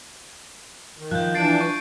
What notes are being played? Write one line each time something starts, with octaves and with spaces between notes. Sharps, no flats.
D#3
F3 F#6 G6
E3 D4 A6 C7 D7
C#6